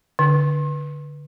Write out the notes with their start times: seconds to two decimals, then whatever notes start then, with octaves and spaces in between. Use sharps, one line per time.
0.19 D3